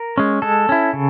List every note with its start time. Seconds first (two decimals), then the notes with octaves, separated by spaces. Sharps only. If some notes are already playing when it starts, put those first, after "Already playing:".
Already playing: A#4
0.18 G#3 C#4
0.42 G#3 A4
0.69 C#4 E4
0.93 C#3